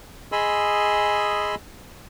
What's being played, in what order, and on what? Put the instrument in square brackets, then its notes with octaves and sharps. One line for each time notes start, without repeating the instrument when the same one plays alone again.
[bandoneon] G#4 D#5 G#5 B5 C6 E6